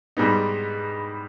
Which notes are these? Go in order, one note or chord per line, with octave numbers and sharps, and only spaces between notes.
G#2 G3 B3 D#4